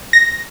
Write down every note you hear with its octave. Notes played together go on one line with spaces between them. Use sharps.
A#6